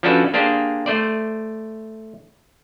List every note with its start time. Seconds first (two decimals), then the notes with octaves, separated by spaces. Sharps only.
0.03 F3 C#4 D4 F#4 A4 B4
0.34 A#3 D4 G4 G#4 C5
0.86 A3 C5 D5